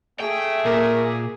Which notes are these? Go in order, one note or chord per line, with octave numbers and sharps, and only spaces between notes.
A3 G#4 E5 G5
A#2 A#4